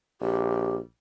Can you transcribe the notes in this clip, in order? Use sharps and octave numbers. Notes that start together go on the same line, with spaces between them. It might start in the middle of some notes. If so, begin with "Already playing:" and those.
A#1 G4